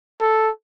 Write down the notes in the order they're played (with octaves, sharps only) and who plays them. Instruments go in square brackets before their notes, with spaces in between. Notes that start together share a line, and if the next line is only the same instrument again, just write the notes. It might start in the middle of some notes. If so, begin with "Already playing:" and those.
[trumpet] A4